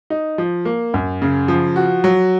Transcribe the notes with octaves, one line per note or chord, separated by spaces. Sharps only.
D#4
F3
A#3
F#2
C#3
F3
F#4
F#3